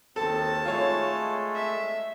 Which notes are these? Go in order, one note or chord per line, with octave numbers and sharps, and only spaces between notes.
D#2 C4 A4 A5
G#3 A3 F4 C#5
E5